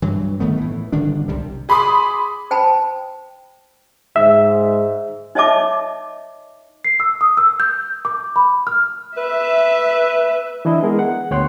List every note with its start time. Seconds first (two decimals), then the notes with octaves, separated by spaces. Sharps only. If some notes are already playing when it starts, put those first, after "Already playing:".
0.02 G2 E3 F#3
0.40 G1 D#3 A3 B3
0.57 A2 E3
0.92 G1 D3 D#3 D4
1.28 C2 C3 G3
1.69 G#4 B5 C6 D6 D#6
2.51 C5 G5 A5 B5
4.16 G#2 E5
5.35 D#4 C#5 D#5 E5 A5 D6
6.85 C7
7.00 E6
7.21 D#6
7.37 E6
7.60 G6
8.05 D6
8.36 B5
8.67 F6
9.17 B4 E5
10.65 E3 D4 E4 D#5
10.83 G#3 B3 G#4 A#4
10.99 F#5
11.31 D2 B3 C#5 G5 C6 F#6